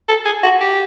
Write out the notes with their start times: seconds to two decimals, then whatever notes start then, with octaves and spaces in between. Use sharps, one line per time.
0.09 A4
0.25 G#4
0.43 F#4
0.61 G4